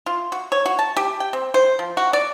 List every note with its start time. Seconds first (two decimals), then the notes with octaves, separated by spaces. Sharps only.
0.06 F4
0.32 F#4
0.52 C#5
0.66 F#4
0.79 A5
0.96 G4
1.20 G5
1.33 C4
1.54 C5
1.79 F3
1.97 F#4
2.13 D5